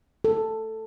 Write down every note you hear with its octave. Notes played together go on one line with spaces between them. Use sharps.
A4